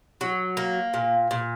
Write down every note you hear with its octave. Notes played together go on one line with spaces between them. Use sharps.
F#3
A#3
A#2
A#2